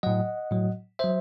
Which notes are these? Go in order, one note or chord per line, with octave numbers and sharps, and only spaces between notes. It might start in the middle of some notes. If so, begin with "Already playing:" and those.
A2 F#3 D#5 F#5
A2 F#3
F#3 C5 E5